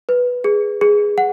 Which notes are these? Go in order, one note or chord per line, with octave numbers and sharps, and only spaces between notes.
B4
G#4
G#4
F#5